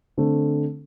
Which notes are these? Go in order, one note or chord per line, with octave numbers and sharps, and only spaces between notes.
D3 A3 C4